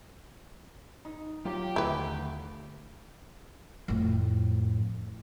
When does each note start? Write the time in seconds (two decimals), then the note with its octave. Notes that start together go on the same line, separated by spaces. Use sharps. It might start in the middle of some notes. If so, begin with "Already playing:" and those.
1.05 D#4
1.45 F#3 F4 G4
1.76 D#2 D3 A3 E4 B4
3.88 F2 A2